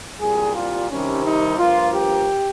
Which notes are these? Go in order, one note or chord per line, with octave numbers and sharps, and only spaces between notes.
C2 A#2 G3 G#4
F4
C2 C3 D#3 G3 C#4
D#4
G2 F3 A#3 F4
G4